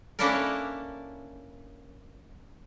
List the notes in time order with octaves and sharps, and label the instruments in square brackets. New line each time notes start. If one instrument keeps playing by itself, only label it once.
[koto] A#3 C#4 D4 E4 A4 A#4